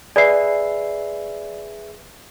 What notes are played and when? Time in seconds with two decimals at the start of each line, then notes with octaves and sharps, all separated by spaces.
0.16 G#4 B4 D5 E5 C7